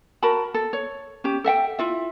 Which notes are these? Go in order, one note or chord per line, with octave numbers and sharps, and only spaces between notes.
F#4 A#4 A5 B5
A4
C#5
C#4 G4
A4 E5 F#5 G5
E4 F4 E5